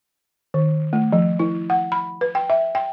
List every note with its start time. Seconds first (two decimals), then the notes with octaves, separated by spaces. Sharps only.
0.54 D#3
0.93 A3
1.12 F3
1.39 E4
1.70 F#5
1.92 B5
2.21 B4
2.35 G5
2.50 E5
2.75 G5